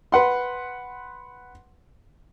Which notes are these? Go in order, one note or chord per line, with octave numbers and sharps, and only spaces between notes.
B4 F#5 C6